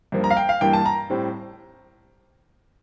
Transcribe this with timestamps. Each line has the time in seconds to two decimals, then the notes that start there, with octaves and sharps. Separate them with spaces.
0.12 G2 F3 A#3
0.24 A#5
0.30 F5
0.37 G5
0.49 F5
0.61 G2 E3 A#3 G5
0.73 A5
0.86 A#5
1.10 A2 G3 C4